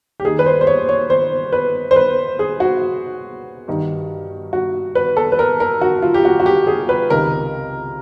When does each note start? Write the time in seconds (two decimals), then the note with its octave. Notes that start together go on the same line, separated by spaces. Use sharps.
0.20 G4
0.25 D#2 D#3 G#4
0.39 B4
0.46 C5
0.61 C5
0.67 C#5
0.89 C#5
1.10 C5
1.53 B4
1.91 C5
1.96 B4
2.39 G#4
2.60 F#4
3.68 G2 D#3
4.53 F#4
4.95 B4
5.17 A4
5.32 B4
5.39 A#4
5.60 A#4
5.81 F#4
6.02 F4
6.14 G4
6.25 F#4
6.40 F#4
6.46 G4
6.67 G#4
6.89 B4
7.10 C#2 C3 D#3 A#4